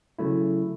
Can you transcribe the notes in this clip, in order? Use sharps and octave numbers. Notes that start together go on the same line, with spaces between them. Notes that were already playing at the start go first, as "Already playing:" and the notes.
C#3 F#3 A3 E4